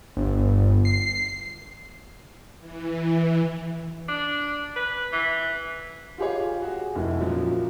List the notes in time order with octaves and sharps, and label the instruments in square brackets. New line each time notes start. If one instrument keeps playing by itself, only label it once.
[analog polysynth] G1
C7
[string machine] E3
[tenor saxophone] D4
B4
E3
[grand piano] F4 G4 G#4 C#5
F#4 G#4
F1 E4
F#2 A#2 F3 F#3